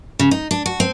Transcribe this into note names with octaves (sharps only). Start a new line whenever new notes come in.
C#3
D#4
D4
F#4
C4